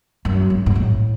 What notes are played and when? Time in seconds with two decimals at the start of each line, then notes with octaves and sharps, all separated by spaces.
0.25 F#2
0.50 G#2
0.66 G#2
0.75 A2